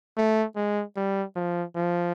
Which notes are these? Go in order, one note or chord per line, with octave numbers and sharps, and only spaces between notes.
A3
G#3
G3
F3
F3